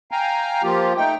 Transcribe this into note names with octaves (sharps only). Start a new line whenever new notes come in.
F5 G5 G#5 A#5
F3 A#3 F4 G4
A3 D#4 G5